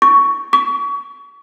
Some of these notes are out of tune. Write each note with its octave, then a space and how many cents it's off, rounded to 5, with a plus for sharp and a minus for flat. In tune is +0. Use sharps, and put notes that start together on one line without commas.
C#6 +10
C#6 +35